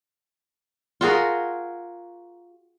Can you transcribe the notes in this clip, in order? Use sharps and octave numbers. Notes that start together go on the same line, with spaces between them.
F4 F#4 G#4 A#4